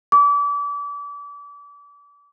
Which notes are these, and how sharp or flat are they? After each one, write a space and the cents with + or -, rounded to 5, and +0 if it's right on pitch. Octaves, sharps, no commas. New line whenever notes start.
D6 -35